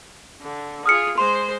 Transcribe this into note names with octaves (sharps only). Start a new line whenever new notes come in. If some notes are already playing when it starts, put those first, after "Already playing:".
D3
F4 G#4 D#6 F6 C#7
G#3 C5 C6